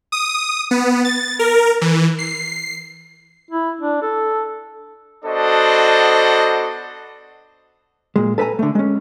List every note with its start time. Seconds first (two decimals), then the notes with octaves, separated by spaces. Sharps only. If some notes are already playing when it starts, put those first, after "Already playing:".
0.12 D#6
0.71 B3
1.05 A6
1.39 A#4
1.81 E3
2.19 C7
3.51 E4
3.81 D4
4.02 A4
5.24 B3 D4 F#4 A4 C5 D#5
8.16 A#2 G#3
8.38 A4 B4 C#5 G#5 A#5
8.59 D3 A3
8.75 G#3 C#4